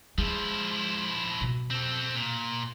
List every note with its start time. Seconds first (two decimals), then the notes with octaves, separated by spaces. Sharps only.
0.18 F3 G#3 E4
1.41 B2
1.71 C4 A4
2.15 A#2